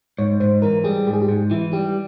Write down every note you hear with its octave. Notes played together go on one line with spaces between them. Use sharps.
G#2 C#5
G#2 C5
E3 A#4
G3 G#4
G#2 G4
G#4
G4
G#2
E3 E4
G3 G4